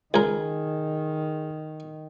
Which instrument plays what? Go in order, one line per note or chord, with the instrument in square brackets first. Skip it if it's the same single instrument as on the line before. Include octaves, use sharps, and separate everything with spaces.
[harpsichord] C#2 A#4 [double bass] D#3 [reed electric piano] G#4 G#6